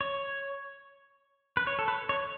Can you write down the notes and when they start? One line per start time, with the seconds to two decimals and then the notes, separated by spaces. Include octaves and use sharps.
0.01 C#5
1.57 B4
1.67 C#5
1.79 A4
1.88 B4
2.09 C#5